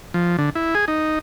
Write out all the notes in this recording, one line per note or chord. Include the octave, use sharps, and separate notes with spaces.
F3
D3
E4
G#4
D#4